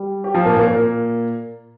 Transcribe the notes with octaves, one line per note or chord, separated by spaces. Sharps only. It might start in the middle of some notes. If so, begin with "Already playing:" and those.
Already playing: G3
G4
F3 F4
A#2 A#3
A#2 A#3
A#2 A#3